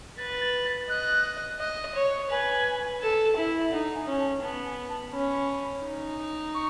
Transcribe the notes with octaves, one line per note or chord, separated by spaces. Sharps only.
B4 A6
A6
A6
D#5 F#6
D#5
C#5
B4 G#5
A4
E4
D#4 F#5
G#5
C#4 G#5
A5
B3 A5
G#5
A5
C#4 B5
D#4
C#6